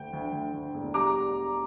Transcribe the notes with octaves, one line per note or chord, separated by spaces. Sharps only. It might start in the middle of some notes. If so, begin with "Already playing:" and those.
Already playing: D2 D3 G5
D2
D2
D2
E1
G3 A#5 D6